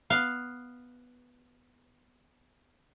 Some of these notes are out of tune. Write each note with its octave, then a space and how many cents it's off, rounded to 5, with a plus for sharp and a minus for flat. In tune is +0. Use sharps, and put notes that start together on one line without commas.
B3 +0 F5 +0